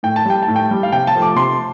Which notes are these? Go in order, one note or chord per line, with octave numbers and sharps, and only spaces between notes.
A2 G5
A5
G3 G5
A5
A2
G5
G3
F5
C3 G5
A5
F3 A3
D6
C3 C6